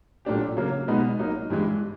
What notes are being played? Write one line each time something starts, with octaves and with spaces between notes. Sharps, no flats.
A#2 F#3 A3 D4 G4
C#3 F#3 A#3
B2 G#3 B3 D#4
F#3 A#3 D#4
G2 E3 G#3